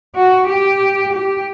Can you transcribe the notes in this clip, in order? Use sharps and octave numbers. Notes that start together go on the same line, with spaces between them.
F#4
G4
G4